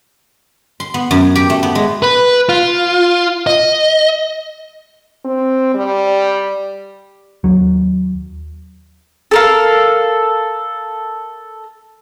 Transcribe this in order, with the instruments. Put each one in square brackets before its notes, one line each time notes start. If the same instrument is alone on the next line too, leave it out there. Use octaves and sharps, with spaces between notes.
[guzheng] C6
B3
F#2
G4
A3
B3
G#3
[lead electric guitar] B4
F4
D#5
[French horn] C4
G3
[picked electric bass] D#2 F#3
[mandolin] A4 A#4 F5